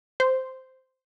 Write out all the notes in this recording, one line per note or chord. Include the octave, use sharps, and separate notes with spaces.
C5